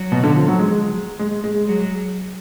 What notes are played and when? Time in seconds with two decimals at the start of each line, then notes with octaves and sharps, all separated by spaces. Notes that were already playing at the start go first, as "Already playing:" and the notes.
Already playing: F#3
0.12 B2
0.23 D3
0.36 F3
0.48 F#3
0.59 G#3
1.19 G#3
1.44 G#3
1.68 F#3